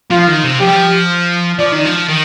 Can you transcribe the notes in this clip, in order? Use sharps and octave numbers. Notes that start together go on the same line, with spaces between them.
F3 F4
D#3
C3
F3 G4
G3
F3
F3 D5
D#3
F3
D#3